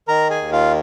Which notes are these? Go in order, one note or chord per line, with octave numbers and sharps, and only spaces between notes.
D#3 A#4 A#5
G#4 G#5
D#2
F4 F5